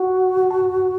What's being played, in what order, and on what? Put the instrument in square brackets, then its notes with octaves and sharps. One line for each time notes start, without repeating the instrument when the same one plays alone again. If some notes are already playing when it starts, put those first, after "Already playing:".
Already playing: [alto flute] F#4 [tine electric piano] F#5
[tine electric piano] A5